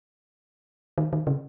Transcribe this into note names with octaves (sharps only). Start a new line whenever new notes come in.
D#3
D#3
C#3